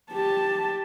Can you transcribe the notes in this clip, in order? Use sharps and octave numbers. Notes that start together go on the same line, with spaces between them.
G4 A5